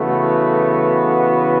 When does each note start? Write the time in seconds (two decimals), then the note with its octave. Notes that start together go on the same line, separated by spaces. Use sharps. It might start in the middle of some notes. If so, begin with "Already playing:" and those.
Already playing: C#3 E3 A3 B3 F#4